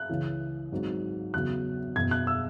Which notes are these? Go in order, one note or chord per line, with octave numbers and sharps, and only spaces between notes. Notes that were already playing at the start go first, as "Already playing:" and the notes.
Already playing: F#6
C#2 C#3 E3
G#1 G#2 F#3
E2 C#3 F#3 F#6
F#1 E2 B2 G#6
F#6
E6